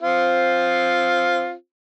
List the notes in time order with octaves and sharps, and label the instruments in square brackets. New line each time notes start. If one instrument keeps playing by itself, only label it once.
[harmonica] C4 F4